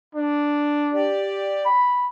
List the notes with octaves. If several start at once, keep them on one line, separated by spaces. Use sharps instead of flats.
D4
G4 D5
B5